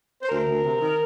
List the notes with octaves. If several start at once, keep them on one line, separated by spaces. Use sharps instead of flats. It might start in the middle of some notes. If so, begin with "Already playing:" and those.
C5
D2 A#4
D2
C3
D#3